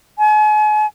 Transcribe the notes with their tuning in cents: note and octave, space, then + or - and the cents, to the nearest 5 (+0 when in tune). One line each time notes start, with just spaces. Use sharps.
G#5 +40